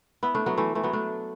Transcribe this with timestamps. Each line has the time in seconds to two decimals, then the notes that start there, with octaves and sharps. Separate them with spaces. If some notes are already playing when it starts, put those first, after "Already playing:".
0.23 B3 E4
0.35 A3 D4
0.46 F#3 B3
0.57 E3 A3
0.75 E3 A3
0.83 F#3 B3
0.93 A3 D4